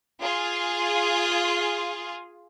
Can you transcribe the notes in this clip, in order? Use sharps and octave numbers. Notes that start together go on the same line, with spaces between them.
F4 G#4